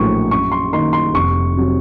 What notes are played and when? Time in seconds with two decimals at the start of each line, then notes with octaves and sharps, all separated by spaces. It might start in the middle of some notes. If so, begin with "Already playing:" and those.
Already playing: A#1 A2 F#3 A#3 C#6
0.30 F#2 C#6
0.52 C6
0.72 D#3 A#3 D#4 C6
0.93 C6
1.14 F1 C#6
1.57 C3 F#3